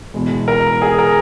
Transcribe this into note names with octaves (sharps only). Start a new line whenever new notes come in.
E2 B2 G#3
A#4
G#4
A#4